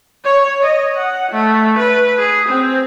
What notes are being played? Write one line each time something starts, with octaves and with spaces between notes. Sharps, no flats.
C#5
D#5
F#5
A3
B4
G#4
C4